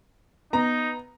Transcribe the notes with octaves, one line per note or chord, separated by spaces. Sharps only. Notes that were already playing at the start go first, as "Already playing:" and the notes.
B3 D#4 A#5